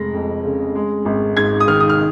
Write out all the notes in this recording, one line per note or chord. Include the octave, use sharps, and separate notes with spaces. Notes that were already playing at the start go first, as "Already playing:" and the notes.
Already playing: F1 G#3 A#6
F2
C#3
G#3
G#1
G#2 G#6
D#6
D#3 F6
D#6
F6